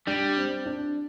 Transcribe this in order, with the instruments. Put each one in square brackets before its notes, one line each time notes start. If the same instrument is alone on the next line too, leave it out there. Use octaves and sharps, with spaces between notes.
[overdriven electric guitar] G3 [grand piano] D4
[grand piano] C4
D4